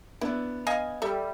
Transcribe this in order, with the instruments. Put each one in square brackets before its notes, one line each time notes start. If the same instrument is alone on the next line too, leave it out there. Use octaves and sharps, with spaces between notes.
[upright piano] B3 D4 [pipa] E4
[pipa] D#5 F5 G#5
[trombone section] G3 [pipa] A4 E5